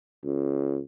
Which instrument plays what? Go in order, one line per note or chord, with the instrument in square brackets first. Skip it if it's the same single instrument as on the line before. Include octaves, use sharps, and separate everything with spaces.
[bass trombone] C#2